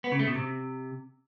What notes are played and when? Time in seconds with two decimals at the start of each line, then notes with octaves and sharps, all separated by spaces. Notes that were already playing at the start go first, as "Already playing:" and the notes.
0.04 B3
0.12 C#3
0.19 A3
0.27 B2
0.35 C3